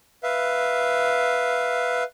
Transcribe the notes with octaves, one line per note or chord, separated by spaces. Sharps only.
B4 E5 F5